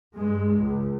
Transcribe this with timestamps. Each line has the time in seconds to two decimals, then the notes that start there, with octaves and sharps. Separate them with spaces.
0.15 G2 G#3
0.59 C#2